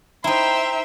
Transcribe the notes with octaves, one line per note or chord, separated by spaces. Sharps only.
D#4 E4 C5 E5 G5 A#5 C6